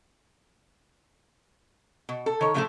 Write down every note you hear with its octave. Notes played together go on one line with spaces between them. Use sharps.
B2
A4
D#3 C#5
A2 D3 F3 A3 G#4 A4